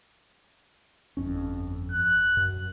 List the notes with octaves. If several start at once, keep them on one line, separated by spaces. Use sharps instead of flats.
G1 F2 C#4
F#6
F#2